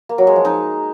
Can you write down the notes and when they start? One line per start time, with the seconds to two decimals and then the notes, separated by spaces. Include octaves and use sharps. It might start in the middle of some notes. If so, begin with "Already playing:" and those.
0.09 A#3
0.18 F#3
0.27 G#3
0.36 F3
0.45 D#4